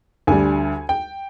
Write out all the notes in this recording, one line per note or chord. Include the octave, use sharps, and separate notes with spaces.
D2 D3 G3 G#5
G5